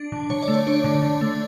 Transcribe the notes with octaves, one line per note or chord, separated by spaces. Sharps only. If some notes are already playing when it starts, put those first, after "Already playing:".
Already playing: D4
D3
D3 C#5
D5
A3
C#5
D4 C#5
D3
D3
A3